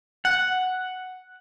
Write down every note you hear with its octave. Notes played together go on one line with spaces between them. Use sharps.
F#5